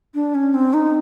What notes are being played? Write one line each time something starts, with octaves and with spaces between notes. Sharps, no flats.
D4
C#4
C4
D#4